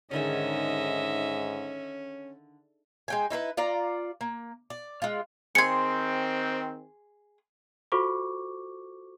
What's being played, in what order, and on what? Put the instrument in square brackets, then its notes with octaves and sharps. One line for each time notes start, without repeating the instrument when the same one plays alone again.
[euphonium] G#2 [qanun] D3 D#3 G#4 [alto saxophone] C#4 [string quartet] D#5 E5
[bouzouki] G#3 G5 G#5
D#4 E4 A4 B4
F4 D5 A#5
A#3
D5
G#3 F4
[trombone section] D#3 C4 [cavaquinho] G#4 C6 [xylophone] G#6 C#7
[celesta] F4 F#4 A4 C5 C#6 D6